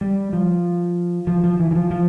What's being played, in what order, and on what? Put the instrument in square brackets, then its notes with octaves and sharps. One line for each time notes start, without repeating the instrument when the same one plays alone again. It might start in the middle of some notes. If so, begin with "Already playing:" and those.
[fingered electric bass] G3
F3
F3
F3
E3
E3
F3
F3